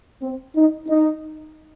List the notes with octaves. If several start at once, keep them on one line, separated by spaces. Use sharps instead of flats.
C4
D#4
D#4